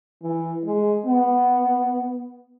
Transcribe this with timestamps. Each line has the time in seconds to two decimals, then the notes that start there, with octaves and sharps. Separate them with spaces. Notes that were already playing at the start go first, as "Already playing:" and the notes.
0.22 E3
0.64 G#3
1.06 B3